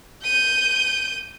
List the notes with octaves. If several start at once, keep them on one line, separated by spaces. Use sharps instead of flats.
G6 D#7